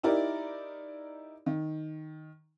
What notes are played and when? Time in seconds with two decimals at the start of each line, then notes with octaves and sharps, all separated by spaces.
0.03 D#4 E4 G4 A#4 D5
1.46 D#3